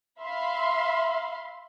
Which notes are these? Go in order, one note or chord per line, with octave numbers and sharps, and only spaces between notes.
E5 F5 B5 C6